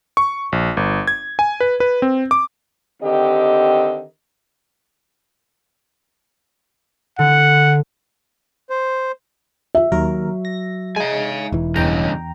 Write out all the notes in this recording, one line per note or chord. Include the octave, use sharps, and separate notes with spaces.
C#6
A#1
G1
G#6
G#5
B4
B4
C4
D6
D3 D#3 C4 G4 D#5
D3 F#5
C5
E5
D#2 F#3 A#4
A#6
G#3 D#4 F5 G#5
E1 E3
E2 G2 C#3 G#3 G5 A#5